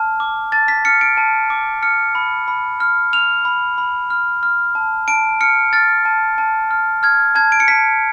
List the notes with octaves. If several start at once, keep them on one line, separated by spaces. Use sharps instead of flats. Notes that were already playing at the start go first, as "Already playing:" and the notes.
Already playing: A5 F6
D6
A5 A6
B6
F6 C#7
D7
A5
D6
F6 C#7
B5
B5
F6
F6 F7
B5
B5
F6
F6
A5
A5 D7
F6 C#7
F6 A6
A5
A5
F6
F6 G#6
A5 G#6
D7
C#7
A5 B6